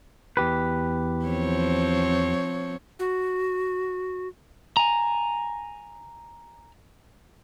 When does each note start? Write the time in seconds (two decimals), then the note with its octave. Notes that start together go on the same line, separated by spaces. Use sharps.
0.37 E2 G4 B4
1.26 F3 C4 C#5
2.99 F#4
4.77 G#5 A#5